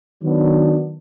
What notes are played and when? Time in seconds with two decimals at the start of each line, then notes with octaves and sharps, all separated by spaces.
0.23 D#3 F#3 B3 D4